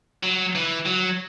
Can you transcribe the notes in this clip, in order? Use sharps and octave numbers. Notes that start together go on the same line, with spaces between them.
F#3
E3
F#3